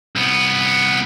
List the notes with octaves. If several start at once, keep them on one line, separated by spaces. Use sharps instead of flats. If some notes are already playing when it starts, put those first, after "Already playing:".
C2 B3